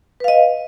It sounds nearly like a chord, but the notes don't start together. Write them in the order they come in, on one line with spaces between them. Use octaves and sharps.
B4 F5 D#5